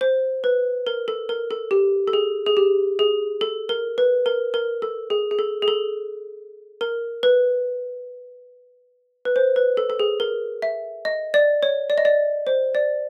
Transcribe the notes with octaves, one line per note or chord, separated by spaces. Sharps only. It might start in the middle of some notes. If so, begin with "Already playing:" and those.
C5
B4
A#4
A4
A#4
A4
G4
A4
G#4
G#4
G4
G#4
A4
A#4
B4
A#4
A#4
A4
G#4
G#4
A4
G#4
A4
A#4
B4
B4
C5
B4
A4
A4
G#4
A#4
E5
D#5
D5
C#5
D5
D#5
D5
C5
D5